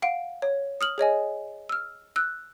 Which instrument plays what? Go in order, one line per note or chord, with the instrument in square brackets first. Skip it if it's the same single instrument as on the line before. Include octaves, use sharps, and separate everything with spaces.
[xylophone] F5 F#5 D7
C#5
D#6 F6 F#7
G#4 C#5 D#5 G#5
E6 F6
E6 F#6